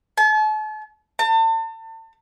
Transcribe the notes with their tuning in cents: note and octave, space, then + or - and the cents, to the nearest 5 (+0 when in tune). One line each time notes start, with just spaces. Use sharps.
A5 -40
A5 +40